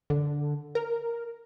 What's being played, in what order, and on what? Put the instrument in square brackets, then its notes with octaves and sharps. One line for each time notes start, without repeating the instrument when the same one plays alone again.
[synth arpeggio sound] D3
A#4